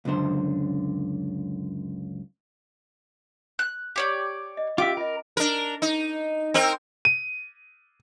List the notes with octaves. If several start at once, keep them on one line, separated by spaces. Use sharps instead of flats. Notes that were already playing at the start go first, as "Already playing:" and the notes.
C#2 F#2 D3 C5
F#6
G4 C#5 D5
D#5
C#4 F4 G4 E5 D6
F4 A#4 D#5
D4 A#4
D#4
C4 D#4 A#4
D#7